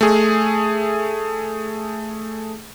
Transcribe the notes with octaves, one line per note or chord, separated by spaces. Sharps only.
A3 G#4